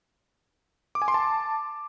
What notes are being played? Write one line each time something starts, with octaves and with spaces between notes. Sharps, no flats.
D6
G#5
C6
A5